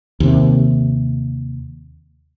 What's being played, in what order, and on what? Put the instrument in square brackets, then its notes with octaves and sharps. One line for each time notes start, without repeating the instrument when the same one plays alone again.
[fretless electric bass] D#2 C3